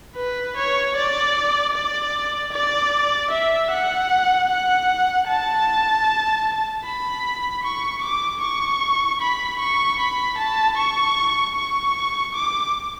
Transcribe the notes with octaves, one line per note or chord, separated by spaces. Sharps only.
B4
C#5
D5
D5
D5
E5
F#5
F#5
A5
B5
C#6
D6
C#6
B5
C#6
B5
A5
C#6
C#6
D6